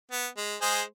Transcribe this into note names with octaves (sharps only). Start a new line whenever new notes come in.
B3
G#3
G#3 G#4 C5